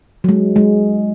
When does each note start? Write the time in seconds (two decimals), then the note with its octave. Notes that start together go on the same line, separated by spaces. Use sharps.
0.24 F#3
0.29 G#3
0.56 G#3